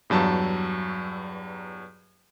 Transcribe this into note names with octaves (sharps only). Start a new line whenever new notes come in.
E2 G2 F#3 A5